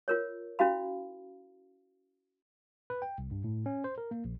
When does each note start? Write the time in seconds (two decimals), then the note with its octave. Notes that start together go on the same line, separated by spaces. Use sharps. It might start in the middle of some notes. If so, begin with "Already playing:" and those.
0.08 F4 A#4 C#5
0.59 C#4 E4 F#4 F5 B5
2.90 B4
3.02 G5
3.18 C2
3.31 G2
3.44 A2
3.66 C#4
3.84 C5
3.98 A#4
4.11 A#3
4.25 A#1